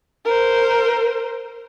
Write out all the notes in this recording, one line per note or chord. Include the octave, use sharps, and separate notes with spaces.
A#4 C5